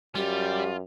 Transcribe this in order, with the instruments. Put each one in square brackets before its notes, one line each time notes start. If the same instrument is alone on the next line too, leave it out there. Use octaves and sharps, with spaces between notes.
[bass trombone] F#2 [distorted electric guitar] G3 [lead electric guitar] F4 [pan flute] G4